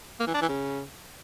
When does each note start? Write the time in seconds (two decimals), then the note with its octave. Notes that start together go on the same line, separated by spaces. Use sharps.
0.20 A#3
0.27 E3
0.34 D4
0.41 E3
0.48 C#3